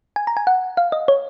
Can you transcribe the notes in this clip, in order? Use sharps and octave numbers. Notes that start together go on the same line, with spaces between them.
G#5
A#5
G#5
F#5
F5
D#5
C#5